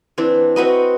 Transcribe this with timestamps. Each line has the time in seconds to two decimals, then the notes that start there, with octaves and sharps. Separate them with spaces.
0.18 E3 C4 D4
0.56 C4 F#4 B4 D#5